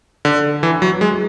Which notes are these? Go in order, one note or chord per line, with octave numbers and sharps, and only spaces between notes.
D3
E3
F#3
G#3